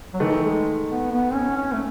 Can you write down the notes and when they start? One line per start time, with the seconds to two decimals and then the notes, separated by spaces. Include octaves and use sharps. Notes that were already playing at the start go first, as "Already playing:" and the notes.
0.13 F#3
0.20 D#3 E3 A3 D#4
0.43 G#3
0.89 B3
1.11 B3
1.34 C#4
1.57 C#4
1.72 A3